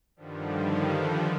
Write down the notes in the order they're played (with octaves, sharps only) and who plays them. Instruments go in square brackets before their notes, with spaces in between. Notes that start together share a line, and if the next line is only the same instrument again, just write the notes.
[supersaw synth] G2 D3 D#3 F3 G3